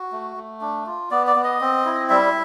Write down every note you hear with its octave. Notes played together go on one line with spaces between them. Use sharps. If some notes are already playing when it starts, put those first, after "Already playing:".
Already playing: F#4
A3
A3
D4
F4
B3 D5
D5
B3
D#5
C4
E4
G3 E5